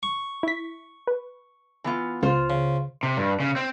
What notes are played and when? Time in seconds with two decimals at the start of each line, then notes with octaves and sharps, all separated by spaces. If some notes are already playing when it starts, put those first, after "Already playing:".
0.03 C#6
0.43 E4 B6
1.07 B4
1.84 E3 B3 F4
2.23 C#2 F4 C5
2.50 C#3
3.03 C3
3.17 G2
3.40 C#3
3.56 C4